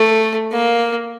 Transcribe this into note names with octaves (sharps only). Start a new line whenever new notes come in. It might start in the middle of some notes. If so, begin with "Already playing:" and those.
Already playing: A3
A#3